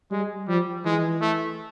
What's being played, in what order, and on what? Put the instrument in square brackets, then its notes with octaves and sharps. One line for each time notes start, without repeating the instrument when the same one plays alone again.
[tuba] G3 [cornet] G#3
[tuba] F3 [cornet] G3
[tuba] E3 [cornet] G#3
[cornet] A3